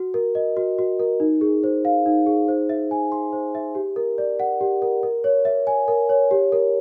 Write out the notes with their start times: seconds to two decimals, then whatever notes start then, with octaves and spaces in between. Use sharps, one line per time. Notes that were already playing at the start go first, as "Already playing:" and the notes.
Already playing: F#4
0.14 A#4
0.35 D#5
0.57 F#4
0.78 F#4
0.99 A#4
1.20 D#4
1.41 G#4
1.64 C5
1.85 F5
2.06 D#4
2.26 G#4
2.48 C5
2.69 E5
2.91 G#5
3.12 C6
3.33 C5
3.55 E5
3.75 G4
3.96 A#4
4.18 D5
4.40 F#5
4.61 G4
4.82 A#4
5.03 A#4
5.24 C#5
5.45 E5
5.67 G#5
5.88 A#4
6.09 C#5
6.31 G4
6.52 A#4